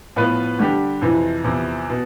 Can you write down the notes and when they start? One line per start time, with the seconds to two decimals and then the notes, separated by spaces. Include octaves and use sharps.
0.16 A2 F3 B3 F4 B4
0.59 D3 G3 D4 G4
1.01 F2 C3 E3
1.44 E2 C3 F3
1.90 B2